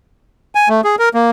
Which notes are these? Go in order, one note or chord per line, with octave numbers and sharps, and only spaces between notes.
G#5
A3
G#4
A#4
A#3